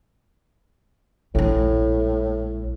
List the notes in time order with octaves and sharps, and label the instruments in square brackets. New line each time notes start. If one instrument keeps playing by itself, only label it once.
[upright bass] A#1 G#3 [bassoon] A2